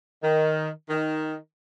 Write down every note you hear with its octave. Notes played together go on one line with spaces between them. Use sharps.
D#3
D#3